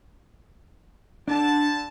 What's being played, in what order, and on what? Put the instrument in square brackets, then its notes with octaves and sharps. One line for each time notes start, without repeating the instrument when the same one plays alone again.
[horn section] D3 A5 [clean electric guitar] D4